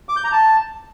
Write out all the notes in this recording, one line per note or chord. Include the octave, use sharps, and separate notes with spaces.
D6
G6
A#5
A5